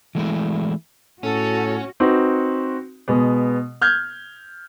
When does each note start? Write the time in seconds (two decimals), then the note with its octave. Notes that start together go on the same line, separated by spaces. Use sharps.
0.15 E3 G#3 A3 E4
1.23 A2 C#4 F#4 A4
2.00 C4 D#4 F#4 B4
3.08 B2 G#3 B3
3.82 F6 G6 G#6